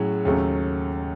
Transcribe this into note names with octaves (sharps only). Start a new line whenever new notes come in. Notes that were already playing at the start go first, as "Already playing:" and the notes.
Already playing: A2 F#3 C#4 G#4
D#2 C#3 F#3 A3 C#4